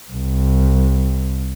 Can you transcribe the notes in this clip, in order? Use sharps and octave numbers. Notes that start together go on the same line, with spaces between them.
C2